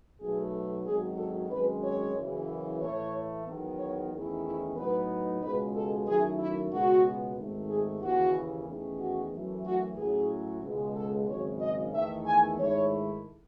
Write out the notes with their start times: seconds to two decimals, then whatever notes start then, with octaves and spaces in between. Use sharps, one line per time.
0.20 B1 B2 F#3 A3 G#4
0.86 G#1 F#2 D#3 F#3 G#4
1.18 A4
1.51 G#1 F#2 D#3 G#3 C#4 B4
1.83 C#5
2.16 F#1 F#2 C#3 E3
2.81 A2 E3 A3 E4 C#5
3.46 E2 D#3 F#3 B3
3.79 C#5
4.12 E2 D#3 A3 C#4 E4
4.44 E4
4.77 A2 F#3 B3 D#4 B4
5.42 C#2 B2 G#3 B4
5.74 A4
6.07 F#2 D#3 A3 E4 G#4
6.39 E4
6.72 C#2 B2 G#3 B3 F#4
7.37 G#1 G#2 D#3 A3
7.70 G#4
8.02 D#2 C#3 E3 F#4
8.67 E2 D#3 A3 C#4
9.00 F#4
9.33 F#2 E3 A3
9.65 F#4
9.98 A2 F#3 C#4 E4 G#4
10.63 C#2 B2 G#3
10.96 A4
11.28 G#1 F#2 C#3 C#5
11.60 D#5
11.93 E2 D#3 A3 E5
12.26 G#5
12.58 G#2 D#3 A3 E4 C#5